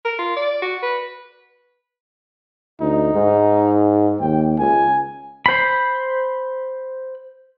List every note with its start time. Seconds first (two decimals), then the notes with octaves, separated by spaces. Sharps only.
0.05 A#4
0.19 F4
0.36 D5
0.62 F#4
0.82 B4
2.81 D2 D#4
3.14 G#2
4.20 D#2 G5
4.59 C#2 G#5
5.46 C5 B5